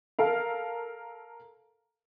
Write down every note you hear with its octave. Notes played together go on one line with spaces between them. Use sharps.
A4 A#4 F5